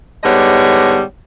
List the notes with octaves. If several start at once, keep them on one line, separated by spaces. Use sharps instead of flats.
G#2 D3 G3 B3 C#5 D#5